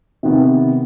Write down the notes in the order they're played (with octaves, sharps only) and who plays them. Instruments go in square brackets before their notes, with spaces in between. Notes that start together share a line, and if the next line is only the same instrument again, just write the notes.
[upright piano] C3 D#3 B3